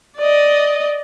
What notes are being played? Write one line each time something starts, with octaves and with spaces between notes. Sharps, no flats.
D5 D#5